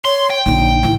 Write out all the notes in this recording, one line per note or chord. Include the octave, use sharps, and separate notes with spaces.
C#5 C6
G5
A#1 D3 D#4
A1 D#3 E4